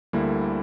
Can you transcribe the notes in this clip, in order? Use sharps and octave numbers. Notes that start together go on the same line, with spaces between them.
D2 D3 G3 A#3 E4